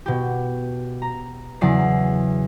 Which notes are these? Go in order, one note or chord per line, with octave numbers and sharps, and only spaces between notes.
B2 G4
A#5
E2 C#3 F#3 D5 C7